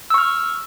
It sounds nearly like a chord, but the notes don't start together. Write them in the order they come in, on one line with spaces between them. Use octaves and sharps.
E6 C#6 F6